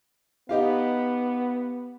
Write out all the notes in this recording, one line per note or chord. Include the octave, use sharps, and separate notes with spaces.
B3 D#4 G4 F5